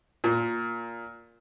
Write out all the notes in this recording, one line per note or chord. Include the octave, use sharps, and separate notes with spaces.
A#2